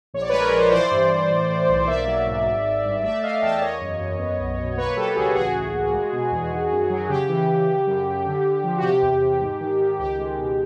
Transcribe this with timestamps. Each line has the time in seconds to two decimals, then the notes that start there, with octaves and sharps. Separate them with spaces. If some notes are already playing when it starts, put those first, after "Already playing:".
0.14 A#1 C#5
0.22 D5
0.29 G#3 B4 C#5
0.40 A#4
0.48 B4
0.53 F3 C5
0.64 C#5
0.72 E3 C5 D5
0.91 G2
1.11 E3
1.30 A2
1.49 A2
1.68 B1
1.87 A#3 D5 E5
2.07 F#3
2.26 G#2
2.46 G#1
2.65 G#1
2.85 G2
3.03 A3 D5 E5
3.23 A3 D#5 F5
3.42 E2 G5 A5
3.61 A#3 C#5 D#5
3.81 F#2
4.00 F#2
4.19 B3
4.39 B1
4.58 B2
4.77 A#3 B4 C#5
4.97 F#3 G4 A4
5.16 C#2 F#4 G#4
5.35 A1 F#4 G#4
5.55 A1
5.74 A#3
5.93 G#3
6.12 B2
6.31 E2
6.51 D#3
6.71 F#2
6.90 F#3
7.09 C#3 G4
7.29 E3
7.48 E3
7.67 C#3
7.87 F#2
8.05 F#2
8.24 D3
8.44 D3
8.64 F3
8.77 F#4
8.83 C3 G4
9.02 E2
9.22 C3
9.41 G#2
9.60 D#3
9.80 D#3
9.99 C#2 G4
10.18 G#3
10.37 B2